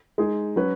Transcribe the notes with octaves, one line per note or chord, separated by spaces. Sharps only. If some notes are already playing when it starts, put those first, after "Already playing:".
G#3 D#4 G#4
F#3 C#4 B4